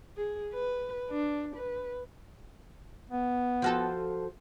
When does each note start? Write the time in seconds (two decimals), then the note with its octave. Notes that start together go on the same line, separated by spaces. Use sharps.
0.17 G#4
0.54 B4
1.10 D4
1.56 B4
3.10 B3
3.62 F3 F#4 A4